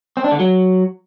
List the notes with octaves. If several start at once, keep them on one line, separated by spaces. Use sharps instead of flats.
C4
D4
D3
F#3